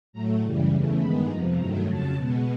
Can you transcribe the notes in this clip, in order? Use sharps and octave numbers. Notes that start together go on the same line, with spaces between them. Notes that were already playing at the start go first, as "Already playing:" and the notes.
A2 F#3 A3 A#5
F#2 C#3 E3 G3
E2 C#3 E3 A3
G2 D#3 G#3 B3 B5
F2 C3 F3 A#5
G2 D#3 F#3 A3 A#5
F2 C#3 F#3 A5
B2 G#3 B3